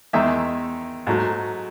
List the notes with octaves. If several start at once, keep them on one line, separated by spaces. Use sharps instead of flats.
E2 D#3 G#3 E5
G#2 F#3 A3